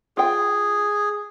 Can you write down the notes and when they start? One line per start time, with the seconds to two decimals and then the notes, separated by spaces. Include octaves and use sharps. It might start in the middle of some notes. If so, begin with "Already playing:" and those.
0.17 F4 G#4 G5